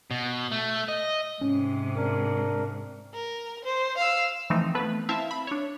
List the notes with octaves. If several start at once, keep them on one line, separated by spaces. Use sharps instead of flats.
B2
A3
D#5
G#2 C3 C#4
D4 A#4
A#4
C5
F5 E6
E3 F3 A3 C4 D#4
A3 B3 B4
C4 E4 E5 F5 A5
B5
D4 C#5